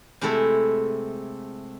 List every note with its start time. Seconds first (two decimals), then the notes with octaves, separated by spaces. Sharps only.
0.21 C3 G#3 A3 E4 A4